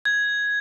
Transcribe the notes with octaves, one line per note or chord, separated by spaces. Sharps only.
G#6